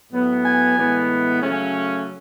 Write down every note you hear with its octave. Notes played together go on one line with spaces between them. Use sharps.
A2 F#3 B3
G#5
A2 E3 G#3 B3
C#3 F#3 A3 C#4